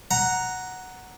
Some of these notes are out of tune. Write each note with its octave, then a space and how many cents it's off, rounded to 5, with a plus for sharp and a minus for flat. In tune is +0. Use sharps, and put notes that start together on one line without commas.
F#5 +0 A#5 +0